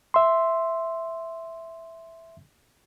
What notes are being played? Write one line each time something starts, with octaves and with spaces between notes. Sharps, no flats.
E5 C6